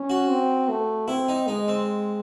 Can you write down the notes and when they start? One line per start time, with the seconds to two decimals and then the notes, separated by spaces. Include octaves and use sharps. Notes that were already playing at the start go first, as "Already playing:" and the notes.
Already playing: C#4
0.10 F#4
0.28 C4
0.69 A3
1.08 C4 E4
1.28 D#4
1.47 G#3 D#4
1.68 C4